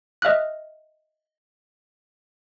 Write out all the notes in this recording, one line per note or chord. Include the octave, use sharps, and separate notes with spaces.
D#5 E5 F6 F#6